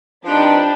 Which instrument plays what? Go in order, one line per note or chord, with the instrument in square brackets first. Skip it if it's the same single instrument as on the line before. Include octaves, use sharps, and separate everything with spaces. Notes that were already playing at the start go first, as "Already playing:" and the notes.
[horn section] F3 C4 D#4 G4 B4 [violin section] D4